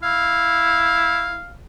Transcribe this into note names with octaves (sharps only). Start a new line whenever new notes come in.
E4 F5